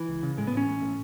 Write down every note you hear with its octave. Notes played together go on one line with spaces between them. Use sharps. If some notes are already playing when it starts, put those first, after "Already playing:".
Already playing: E3
C#2
C#3
A2 G#3
B3
A1 C#4
A1
A2